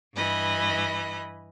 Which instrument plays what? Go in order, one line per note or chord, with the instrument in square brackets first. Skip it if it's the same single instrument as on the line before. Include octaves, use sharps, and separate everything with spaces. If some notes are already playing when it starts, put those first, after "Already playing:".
[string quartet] G2 E3 D#5 B5